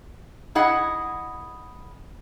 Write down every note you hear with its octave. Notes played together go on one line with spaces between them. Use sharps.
E4 G#4 D#5 F#5